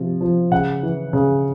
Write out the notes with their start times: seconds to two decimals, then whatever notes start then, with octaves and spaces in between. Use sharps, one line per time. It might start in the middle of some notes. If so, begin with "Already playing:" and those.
Already playing: C3 F3
0.21 F3
0.52 C#3 F#5
0.83 E3
1.13 C#3